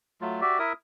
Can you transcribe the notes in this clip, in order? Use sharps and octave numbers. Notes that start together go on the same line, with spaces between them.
F#3 A3 F4
F#4 G4 D5 E5
E4 A#4 E5 D#6